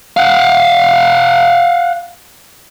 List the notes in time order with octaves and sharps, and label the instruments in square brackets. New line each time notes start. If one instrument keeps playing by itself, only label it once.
[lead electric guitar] F5 F#5